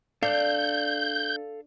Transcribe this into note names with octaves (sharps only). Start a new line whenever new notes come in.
D4 A4 F5 G6